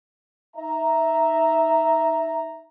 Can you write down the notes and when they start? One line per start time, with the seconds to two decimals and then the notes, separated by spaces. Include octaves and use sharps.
0.56 D#4 E5 A#5